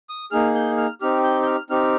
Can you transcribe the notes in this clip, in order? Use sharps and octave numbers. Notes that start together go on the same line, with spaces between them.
D#6
A#3 D#4 G#4 F6
G6
F6
C4 D#4 G4 F6
G6
G6
F6
C4 D#4 G4 F6